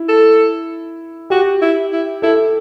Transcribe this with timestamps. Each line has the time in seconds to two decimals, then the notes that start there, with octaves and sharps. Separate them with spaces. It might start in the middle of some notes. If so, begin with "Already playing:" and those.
Already playing: E4
0.08 A4
1.30 F#4 G4
1.62 E4
1.92 E4
2.22 E4 A4